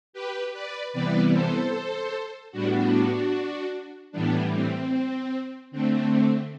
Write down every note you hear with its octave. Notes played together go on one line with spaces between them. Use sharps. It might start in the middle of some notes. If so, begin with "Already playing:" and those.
G4 B4
B4 D5
C3 E3 G3 B3 B4 D5
A4 C5
A2 G3 B3 D4 F#4
A2 E3 G3 B3 D4
C4
D3 A3 C4